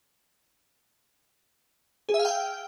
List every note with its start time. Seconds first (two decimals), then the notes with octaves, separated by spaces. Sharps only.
2.09 G#4
2.14 E5
2.19 F5
2.25 G5